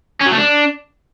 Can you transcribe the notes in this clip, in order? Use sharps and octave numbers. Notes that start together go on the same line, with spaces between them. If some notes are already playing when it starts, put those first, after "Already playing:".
C#4
F#3
A3
D4